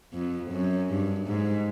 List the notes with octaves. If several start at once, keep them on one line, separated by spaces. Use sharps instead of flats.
F2
F#2
G2
G#2